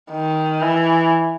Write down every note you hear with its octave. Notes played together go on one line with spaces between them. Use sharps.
D#3
E3